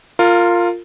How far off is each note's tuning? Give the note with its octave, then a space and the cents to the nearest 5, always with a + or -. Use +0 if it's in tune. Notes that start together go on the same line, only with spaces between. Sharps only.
F4 +0 A#4 -25